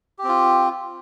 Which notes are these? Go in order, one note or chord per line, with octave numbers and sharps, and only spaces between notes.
C4 F4 G4